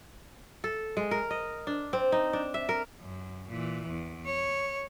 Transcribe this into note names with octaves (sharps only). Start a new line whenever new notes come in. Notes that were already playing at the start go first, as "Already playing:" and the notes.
A4
G#3
A#4
D#5
D4
C4
D#4
D4
E5
A#4
F#2
A#2 E3
E2
C#5